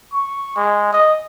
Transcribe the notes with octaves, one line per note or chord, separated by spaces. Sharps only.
C#6
G#3
D#5